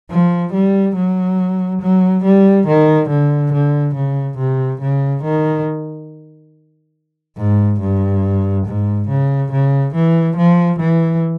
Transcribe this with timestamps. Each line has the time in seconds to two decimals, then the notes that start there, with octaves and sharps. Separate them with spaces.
0.10 F3
0.53 G3
0.96 F#3
1.82 F#3
2.24 G3
2.67 D#3
3.10 D3
3.53 D3
3.95 C#3
4.38 C3
4.81 C#3
5.24 D#3
7.38 G#2
7.80 G2
8.66 G#2
9.09 C#3
9.52 C#3
9.95 E3
10.37 F3
10.80 E3